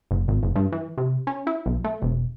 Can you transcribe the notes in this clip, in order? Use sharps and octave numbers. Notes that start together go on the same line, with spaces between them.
F#1
G#1
F#1
G2
E3
C3
C#4
E4
B1
A3
E1